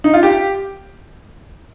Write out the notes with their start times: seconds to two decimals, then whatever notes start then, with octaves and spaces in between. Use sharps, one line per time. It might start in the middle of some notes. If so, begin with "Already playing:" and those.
0.04 D#4
0.14 F4
0.23 G4